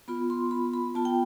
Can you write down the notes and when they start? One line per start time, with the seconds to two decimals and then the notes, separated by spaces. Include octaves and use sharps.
0.08 B3 F4 B5
0.30 C6
0.51 B5
0.74 B5
0.95 B3 F4 A5
1.05 G5